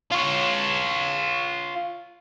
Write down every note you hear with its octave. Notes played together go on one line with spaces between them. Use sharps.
F4 C#5